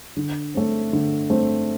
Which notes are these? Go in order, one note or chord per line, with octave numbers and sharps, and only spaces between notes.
D3
A3 C4
D3
A3 C4